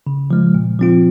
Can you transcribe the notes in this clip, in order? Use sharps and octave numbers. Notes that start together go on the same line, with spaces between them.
C#3
F3 G#3
A#2
F3 C4 F4